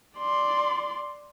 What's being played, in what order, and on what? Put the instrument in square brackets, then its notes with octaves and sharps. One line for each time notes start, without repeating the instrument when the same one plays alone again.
[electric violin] D5 C6